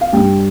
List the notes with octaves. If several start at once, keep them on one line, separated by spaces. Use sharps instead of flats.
F5
G2 G3 G5